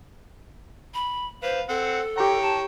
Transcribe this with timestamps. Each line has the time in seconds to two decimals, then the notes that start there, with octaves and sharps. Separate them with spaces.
0.94 B5
1.43 B4 C5 F5
1.69 C4 A4 F#5
2.17 G4 C#5 G5 A#5
2.42 A5